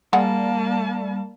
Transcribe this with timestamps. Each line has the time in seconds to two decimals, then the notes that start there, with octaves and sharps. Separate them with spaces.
0.13 G3 G#3 A#3 F#5 A5